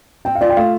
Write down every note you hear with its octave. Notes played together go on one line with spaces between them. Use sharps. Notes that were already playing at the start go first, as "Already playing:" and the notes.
C4 G5
F5
F4 D5
G5
A3 F5